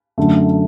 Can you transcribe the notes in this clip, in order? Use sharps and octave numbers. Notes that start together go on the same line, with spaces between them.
F#2 D3 A3